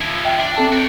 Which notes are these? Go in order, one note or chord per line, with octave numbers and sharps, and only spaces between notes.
F3 E4
E5 G5
D4
C4 A4 A5
F#4 G5